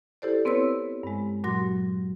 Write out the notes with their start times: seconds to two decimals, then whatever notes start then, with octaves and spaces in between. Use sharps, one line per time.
0.22 E4 G4 A4 C5 D5
0.45 B3 C4 E4 B4 C#5 E6
1.03 G2 G#3
1.44 A#2 F#3 F#4 C6 A#6